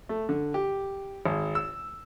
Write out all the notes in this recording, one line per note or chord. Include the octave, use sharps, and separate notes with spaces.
A3
D3
G4
G#1
E6